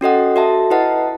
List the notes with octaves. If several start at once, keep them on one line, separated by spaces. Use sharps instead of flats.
C#4 F#4 A4 D#5 F#5
F#4 A4 E5 A5
E4 B4 D#5 F#5 A5